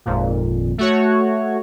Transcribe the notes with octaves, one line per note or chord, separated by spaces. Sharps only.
G#1 F2 A#2
A3 F#4 C#5